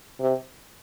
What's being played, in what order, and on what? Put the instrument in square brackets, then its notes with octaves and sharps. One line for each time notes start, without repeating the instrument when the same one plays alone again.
[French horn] C3